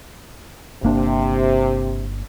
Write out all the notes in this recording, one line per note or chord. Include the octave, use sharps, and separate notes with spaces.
G1 C3 A#3 D4